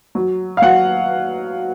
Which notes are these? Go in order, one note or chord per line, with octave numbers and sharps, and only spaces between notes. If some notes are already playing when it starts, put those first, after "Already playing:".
F#3
F5
F#3 F#5